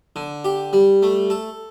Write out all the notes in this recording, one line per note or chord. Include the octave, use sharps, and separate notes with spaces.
D3
G4
G3
A3
A4